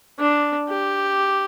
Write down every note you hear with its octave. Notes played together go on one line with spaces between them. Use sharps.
D4
G4